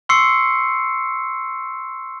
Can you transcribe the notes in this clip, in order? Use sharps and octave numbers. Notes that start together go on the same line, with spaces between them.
C6 C#6 E6 C7 C#7